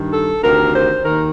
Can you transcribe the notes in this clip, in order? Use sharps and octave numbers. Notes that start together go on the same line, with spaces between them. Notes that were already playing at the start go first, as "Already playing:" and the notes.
Already playing: G2 D#3
A4
D2 C3 D#3 A#4
C5
D#2 D#3 A#4